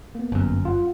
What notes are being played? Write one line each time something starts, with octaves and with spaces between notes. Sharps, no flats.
A#3 B3
G1 F#2
F4 F#5